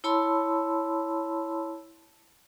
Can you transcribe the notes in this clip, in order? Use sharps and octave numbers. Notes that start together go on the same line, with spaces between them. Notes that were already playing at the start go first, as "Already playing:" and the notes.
E4 C#5 A5 B5 C6 E6